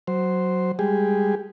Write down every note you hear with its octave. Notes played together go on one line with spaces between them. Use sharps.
F#3 C5
G3 G#3 G4 G#4